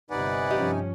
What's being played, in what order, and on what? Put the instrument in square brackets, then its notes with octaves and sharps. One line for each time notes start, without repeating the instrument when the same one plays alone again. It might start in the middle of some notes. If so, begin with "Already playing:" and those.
[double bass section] G1 [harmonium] C3 D#4 G#5 [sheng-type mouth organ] B4 D5 F#5
[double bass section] G2 F3 C#4 [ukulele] G4 D#5